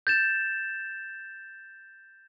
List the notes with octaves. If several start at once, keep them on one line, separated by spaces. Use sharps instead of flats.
G6 A6 E7